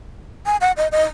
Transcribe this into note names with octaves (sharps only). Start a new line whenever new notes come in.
G#5
F#5
D#5
D#5